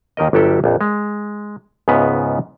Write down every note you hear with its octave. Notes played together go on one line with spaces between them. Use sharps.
D#2 D#3 A#4 D#5
G1 F#3 G4 A4 E5 G5
A#1 F2
G#3
C#2 G#2 C#3 B3 B4 E5